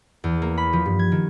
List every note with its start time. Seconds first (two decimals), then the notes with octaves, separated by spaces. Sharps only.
0.24 E2
0.42 A#3
0.58 B5
0.73 F3
0.86 G2
0.99 G#6
1.12 D#3